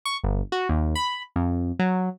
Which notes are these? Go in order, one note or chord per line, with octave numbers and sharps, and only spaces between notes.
C#6
G1
F#4
D#2
B5
F2
F#3